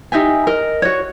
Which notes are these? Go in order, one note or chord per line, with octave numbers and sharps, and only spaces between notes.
D#4 G4 E5 G#5
A#4 D#5
F#4 C#5